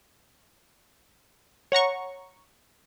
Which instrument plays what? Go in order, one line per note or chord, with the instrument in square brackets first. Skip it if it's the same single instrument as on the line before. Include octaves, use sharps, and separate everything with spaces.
[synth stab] C#5 F#5 A#5 C#6